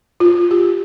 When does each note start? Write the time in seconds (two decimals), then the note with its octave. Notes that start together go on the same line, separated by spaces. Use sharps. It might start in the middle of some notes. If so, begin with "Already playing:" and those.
0.20 F4
0.51 G4